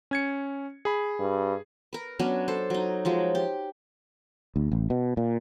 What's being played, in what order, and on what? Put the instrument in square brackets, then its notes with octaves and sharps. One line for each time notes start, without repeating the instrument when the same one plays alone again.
[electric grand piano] C#4 G#6 C#7
G#4 B5
[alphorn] G2
[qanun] A#4 B4
F#3 B3 C#4 D4
A4 C5
F#3 D#4
F3 F#3 G#3
G4
[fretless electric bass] D2
A1
B2
A#2